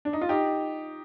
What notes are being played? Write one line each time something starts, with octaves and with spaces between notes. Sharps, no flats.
D4
D#4
F4
D#4 G4